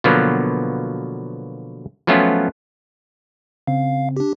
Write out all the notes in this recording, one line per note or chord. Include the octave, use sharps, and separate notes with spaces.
B2 D3 F3 F#3 A#3 B3
F3 F#3 A3 B3 C#4 F4
C#3 C4 F5
D4 G4